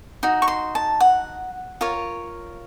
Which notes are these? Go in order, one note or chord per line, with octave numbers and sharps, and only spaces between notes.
D#4 F#4
C#6
C6
A5
F#5
F4 A#4 C#5